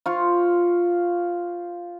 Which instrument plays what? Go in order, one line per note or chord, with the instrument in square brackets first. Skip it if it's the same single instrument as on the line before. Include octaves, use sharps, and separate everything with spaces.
[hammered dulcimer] F4 C5 C#6